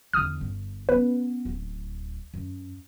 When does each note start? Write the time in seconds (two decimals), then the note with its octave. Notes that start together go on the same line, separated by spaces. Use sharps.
0.13 E2 D3 D#6 F6
0.41 G1
0.89 B3 C#4 B4
1.45 D1
2.34 F#2